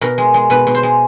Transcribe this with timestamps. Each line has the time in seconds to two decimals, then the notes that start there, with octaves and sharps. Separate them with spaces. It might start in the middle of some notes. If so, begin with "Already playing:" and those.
0.01 B2 A#4
0.18 G#3
0.34 G#3
0.50 B2 B4
0.67 B2
0.75 C5
0.83 G#3